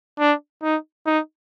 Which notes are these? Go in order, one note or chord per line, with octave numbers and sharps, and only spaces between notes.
D4
D#4
D#4